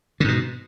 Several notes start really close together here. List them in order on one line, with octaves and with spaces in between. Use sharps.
D3 G#2 B2